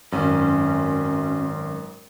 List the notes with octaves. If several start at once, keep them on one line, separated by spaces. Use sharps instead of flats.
G#1 F#2 C#4